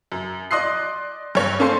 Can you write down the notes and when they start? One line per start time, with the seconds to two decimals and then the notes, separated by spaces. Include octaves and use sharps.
0.12 F#2
0.51 D5 D#5 C6 D#6 F#6 C7
1.35 G2 C#5
1.59 A#3 C#4 D4 A4 C5